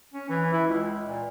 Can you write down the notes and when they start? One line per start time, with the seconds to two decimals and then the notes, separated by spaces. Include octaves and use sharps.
0.14 C#4
0.29 E3
0.52 E4
0.67 C#2
1.06 A#2